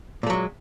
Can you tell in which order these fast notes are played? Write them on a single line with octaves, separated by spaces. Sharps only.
A#2 A3 F#3 G#3